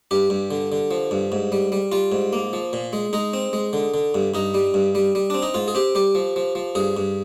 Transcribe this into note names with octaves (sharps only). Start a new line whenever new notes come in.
G2 G4
G2
D3
D3
F3
G2
G#2
G3
G3
G3 F4
G#2
A#3
F3
A#2
G#3
G#3 D#4
C4
G#3
D3
D3
G2
G2 D#4
G3
G2
G3
G3
C4 D4
D#4
G#2 F4
G#4
C4 G4
G3 G4
F3
F3
F3
G2 G#4
G2